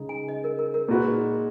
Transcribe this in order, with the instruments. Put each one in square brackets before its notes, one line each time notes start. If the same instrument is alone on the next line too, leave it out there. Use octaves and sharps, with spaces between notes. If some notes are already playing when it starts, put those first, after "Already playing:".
Already playing: [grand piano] C#3 G#3 D#4 G#4
[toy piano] G#5
D#5
A#4
A#4
A#4
[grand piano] A#2 G#3 D#4 F#4 B4